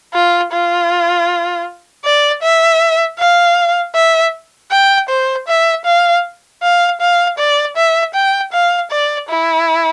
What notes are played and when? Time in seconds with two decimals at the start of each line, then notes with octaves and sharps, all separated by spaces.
0.14 F4
0.52 F4
2.05 D5
2.42 E5
3.19 F5
3.95 E5
4.71 G5
5.09 C5
5.48 E5
5.85 F5
6.63 F5
7.00 F5
7.38 D5
7.77 E5
8.14 G5
8.52 F5
8.91 D5
9.29 E4